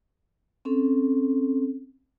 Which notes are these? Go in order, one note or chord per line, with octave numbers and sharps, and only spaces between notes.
C4 C#4 A4